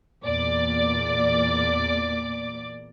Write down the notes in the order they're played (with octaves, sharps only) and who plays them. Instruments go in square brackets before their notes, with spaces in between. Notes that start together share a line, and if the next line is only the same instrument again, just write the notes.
[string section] E2 A#2 D5 D6